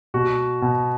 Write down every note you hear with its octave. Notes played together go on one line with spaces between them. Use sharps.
B2 F#4
B2